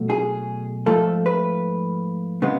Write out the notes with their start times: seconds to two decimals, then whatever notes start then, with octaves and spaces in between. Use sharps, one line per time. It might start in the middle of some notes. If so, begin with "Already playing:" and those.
Already playing: B2 F#3 A3
0.10 G#4
0.86 G#2 F3 A3 A4
1.26 B4
2.42 C#3 G#3 B3